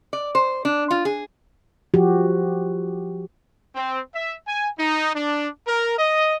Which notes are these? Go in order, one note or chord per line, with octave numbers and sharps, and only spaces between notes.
D5
C5
D4
F4
G#4
F3 F#4 G4
C4
E5
G#5
D#4
D4
A#4
D#5